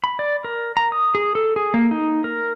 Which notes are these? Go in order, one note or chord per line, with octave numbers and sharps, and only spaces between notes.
B5
D5
A#4
A#5
D#6
G#4
A4
G#4
A#3
D#4
A#4